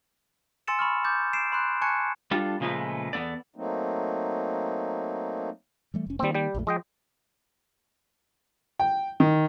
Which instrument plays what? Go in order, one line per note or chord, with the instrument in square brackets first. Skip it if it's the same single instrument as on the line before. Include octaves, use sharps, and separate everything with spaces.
[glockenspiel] G#5 C6 E6 A6 C#7 E7
B5 C#6 F6
D6 G6 A6
C7 D7 E7
B5 C6 F#6
G#5 A5 C#6 F#6 G#6 C#7
[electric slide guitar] G3 D4 F4 A4
A#2 C#3 F3 G#3 A3 B4
E2 B3 A4 D5
[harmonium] F#3 A3 A#3 C4 D#4
[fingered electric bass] E3 G3 A3
F1 C#4
[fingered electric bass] D#3 A#3 [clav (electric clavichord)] G3 C4
[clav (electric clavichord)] G3 G5
[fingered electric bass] A#1 F2 A3
[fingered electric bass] F3 [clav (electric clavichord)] G#3 D#5 G5
[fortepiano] G5
D#3